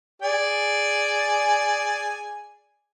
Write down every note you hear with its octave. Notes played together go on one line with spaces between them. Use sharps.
G#4 D5 G#5